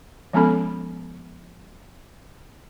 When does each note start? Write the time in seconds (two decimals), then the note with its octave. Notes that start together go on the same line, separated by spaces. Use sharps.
0.33 F3 G#3 B3 C#4 A4 B5